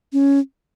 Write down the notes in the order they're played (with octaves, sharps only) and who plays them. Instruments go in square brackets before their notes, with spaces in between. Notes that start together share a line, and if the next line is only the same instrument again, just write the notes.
[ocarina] C#4